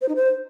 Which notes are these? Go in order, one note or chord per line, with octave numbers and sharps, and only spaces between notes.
C5
D#4
C5